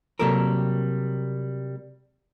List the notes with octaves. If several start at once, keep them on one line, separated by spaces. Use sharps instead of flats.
C3 F#3 G3 A#3 A4 A#4